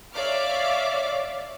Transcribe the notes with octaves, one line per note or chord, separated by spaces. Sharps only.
C#5 D5 E5 F5 D6 F6